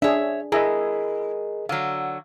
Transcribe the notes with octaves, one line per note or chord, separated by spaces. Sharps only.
D4 G#4 C#5 E5
E4 G#4 A#4 D#5 E5 A#5
D3 F#3 F5